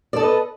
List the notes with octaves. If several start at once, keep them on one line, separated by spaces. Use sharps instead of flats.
A4 B4 D5 D#5